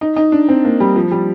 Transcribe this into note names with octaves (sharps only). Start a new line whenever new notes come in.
D#4
D#4
D4
C4
A#3
G3
F3
G3